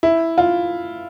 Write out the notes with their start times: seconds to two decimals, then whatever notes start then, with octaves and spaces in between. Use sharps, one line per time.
0.03 E4
0.38 F4